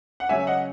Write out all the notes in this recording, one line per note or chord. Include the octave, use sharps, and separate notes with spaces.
F#5
C#3 F#3 C#4 E5 G#5
D#5 F#5